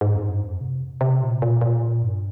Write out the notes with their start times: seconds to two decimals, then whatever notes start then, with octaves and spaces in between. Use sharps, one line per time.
0.01 G#2
0.15 F2
0.21 G2
0.41 F2
0.61 C3
1.01 C3
1.21 A#2
1.42 A#2
1.61 A#2
2.03 G2